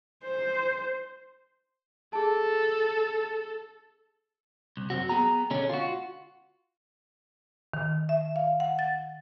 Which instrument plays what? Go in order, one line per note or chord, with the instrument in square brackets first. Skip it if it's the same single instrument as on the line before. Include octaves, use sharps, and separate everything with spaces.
[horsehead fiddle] C5
[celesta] G#4 A5 [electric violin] A4
[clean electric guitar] C2
F#2 C4 F#4
B3 G#4 G5 A#5
B2 D3 G#3 C#4
F4 F#4
[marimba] D#3
E5
F5
F#5
A6